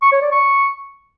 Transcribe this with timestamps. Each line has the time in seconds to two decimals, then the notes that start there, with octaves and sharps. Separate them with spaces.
0.02 C#6
0.12 C#5
0.22 D5
0.32 C#6